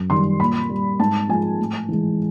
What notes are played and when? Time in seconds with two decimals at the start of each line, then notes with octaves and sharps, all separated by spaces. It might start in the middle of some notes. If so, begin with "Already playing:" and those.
Already playing: F#2
0.10 D#3 G3 C6
0.40 A#2 B5
0.69 G3
0.99 G#2 A5
1.29 F3 G#3 G#5
1.59 A2
1.88 E3 G#3